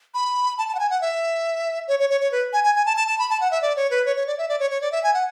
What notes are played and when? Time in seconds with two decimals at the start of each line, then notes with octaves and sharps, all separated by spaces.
0.14 B5
0.58 A5
0.68 A5
0.75 F#5
0.80 G#5
0.90 F#5
1.01 E5
1.88 C#5
1.99 C#5
2.10 C#5
2.21 C#5
2.32 B4
2.53 G#5
2.64 G#5
2.75 G#5
2.86 A5
2.97 A5
3.08 A5
3.19 B5
3.30 A5
3.41 F#5
3.51 E5
3.62 D5
3.76 C#5
3.91 B4
4.06 C#5
4.16 C#5
4.27 D5
4.38 E5
4.49 D5
4.60 C#5
4.71 C#5
4.82 D5
4.92 E5
5.04 G#5
5.14 F#5